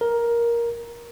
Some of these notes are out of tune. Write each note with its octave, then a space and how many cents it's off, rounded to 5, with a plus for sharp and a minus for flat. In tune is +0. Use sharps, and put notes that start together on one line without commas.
A#4 +10